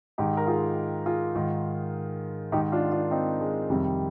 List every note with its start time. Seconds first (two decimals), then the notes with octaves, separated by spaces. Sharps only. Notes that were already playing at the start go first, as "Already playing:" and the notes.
0.18 G#2 D#3 D#4 G4
0.37 A#4
0.47 F4 G#4
1.06 F4 G#4
1.36 G#2 D#3
2.52 G#2 D#3 D#4 G4
2.72 D4 F4
2.92 D4 F4
3.11 C4 D#4
3.41 G#3
3.70 F2 C3 D#3 G3